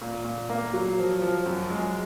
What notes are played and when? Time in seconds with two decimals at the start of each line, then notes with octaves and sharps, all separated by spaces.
0.02 A#2
0.25 A#2
0.49 A#3
0.73 F#3
0.98 F3
1.22 F3
1.46 F#2
1.70 G#3